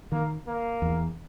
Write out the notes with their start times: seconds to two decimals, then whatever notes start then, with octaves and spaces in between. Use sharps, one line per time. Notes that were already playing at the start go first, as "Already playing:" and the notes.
0.12 D#3 A#3
0.47 A#3
0.82 E2